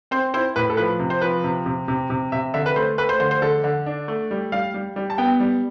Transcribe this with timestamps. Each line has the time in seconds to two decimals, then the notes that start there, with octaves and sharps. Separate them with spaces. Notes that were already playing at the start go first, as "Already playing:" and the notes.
0.11 C4 C5
0.34 E4 C5
0.56 A2 B4
0.70 A4
0.77 F3 B4
0.99 C3
1.10 C5
1.21 F3 B4
1.44 C3
1.66 C3
1.88 C3
2.10 C3
2.32 C3 E5
2.54 D3 E5
2.66 B4
2.76 A3 C5
2.98 A3 B4
3.09 C5
3.20 D3 C5
3.31 C5
3.42 D3 A4
3.64 D3
3.86 D4
4.08 A3
4.31 G3
4.52 G3 F5
4.74 G3
4.96 G3
5.10 A5
5.18 B3 G5
5.40 G3